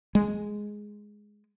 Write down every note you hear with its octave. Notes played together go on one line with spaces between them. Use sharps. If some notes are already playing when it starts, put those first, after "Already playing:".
G#3